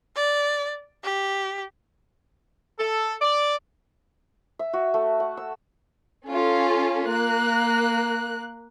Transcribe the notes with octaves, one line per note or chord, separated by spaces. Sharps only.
D5
G4
A4
D5
E5
F#4
A3
F#5
E6
C#4 F4 A4
A#3 F#6